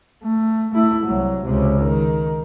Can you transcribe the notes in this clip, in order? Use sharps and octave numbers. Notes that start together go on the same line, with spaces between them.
A3
A3 E4
C2 F#3
C#2 C3
D#3